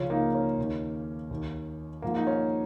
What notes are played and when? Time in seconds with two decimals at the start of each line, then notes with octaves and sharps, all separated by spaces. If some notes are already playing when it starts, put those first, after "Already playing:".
Already playing: C#2 C#3 F3 C#4 F4
0.10 A#3 D#4
0.35 C#4
0.58 D#2 D#3
1.31 D#2 D#3
2.02 G#2 F3 A#3
2.16 D#4
2.27 C#4